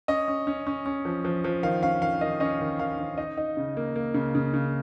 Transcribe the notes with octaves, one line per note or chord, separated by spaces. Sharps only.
C#4 D#5
C#4
C#4
C#4
C#4
F3
F3
F3
D#3 F5
C#4 F5
D#3 F5
D#3 D#5
C#4 D#5
D#3
D#3 F5
C#4
D#4 D#5
D#4
C#3
A#3
A#3
C#3
C#3
C#3